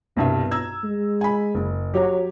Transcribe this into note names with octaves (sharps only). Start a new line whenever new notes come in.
C2 G2 B2 E5
A#5 E6 G#6
G#3
G#5 B5
F#1
F#3 G4 C#5 A#5